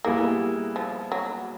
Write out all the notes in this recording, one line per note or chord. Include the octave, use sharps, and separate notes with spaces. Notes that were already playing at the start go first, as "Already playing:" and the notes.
A#2 G3 A#3 B3 E4 G#4
F3
F#3